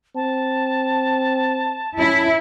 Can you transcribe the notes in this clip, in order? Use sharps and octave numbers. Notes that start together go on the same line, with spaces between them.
C4 A5
C#4 E4